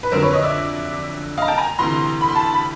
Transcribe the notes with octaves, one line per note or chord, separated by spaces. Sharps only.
B4
F2 D3 F#3 A#4 C5
B4 C#5
C#5 D#5
D5 E5
D#5 F5
A#5
G5 A5
G#5 A#5
D2 C3 E3 A#5 C6
B5
C6
A5 B5
B5